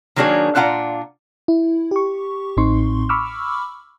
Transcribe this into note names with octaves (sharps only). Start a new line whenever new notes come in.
D#3 F#3 A#3 D4 G#4 C#5
A#2 D4 F4 F#5 A#5
E4
G4 C#6
A1 A2 C4 D#4 C6 C#6
B5 C#6 D6 E6 F6